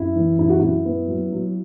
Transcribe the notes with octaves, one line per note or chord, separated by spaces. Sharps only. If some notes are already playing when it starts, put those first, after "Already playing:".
Already playing: F#2 E4
E3
F#2 E4
F#4
F#2 E4
B3
F#3
F#3